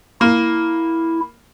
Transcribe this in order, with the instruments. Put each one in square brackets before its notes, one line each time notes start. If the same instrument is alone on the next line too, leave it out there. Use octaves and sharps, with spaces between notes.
[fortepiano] A#3 [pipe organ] E4